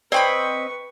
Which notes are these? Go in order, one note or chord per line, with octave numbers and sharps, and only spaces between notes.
C4 B4 D5 D#5 G5 B5 C#6